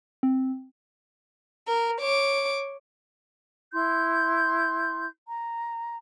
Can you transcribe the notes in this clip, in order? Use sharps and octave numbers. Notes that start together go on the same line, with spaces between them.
C4
A#4
C#5 D6
E4 C6 G6
A#5